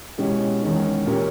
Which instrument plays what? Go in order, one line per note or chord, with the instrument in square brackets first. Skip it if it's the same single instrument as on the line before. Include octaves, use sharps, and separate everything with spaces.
[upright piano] B2 G#3 C#4 E4 G4
E2 D#3 G#3 C#4
A#2 A#3 C#4 G4